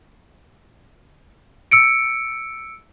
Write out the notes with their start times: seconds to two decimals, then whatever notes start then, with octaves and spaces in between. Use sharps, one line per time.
1.71 E6 C#7 D7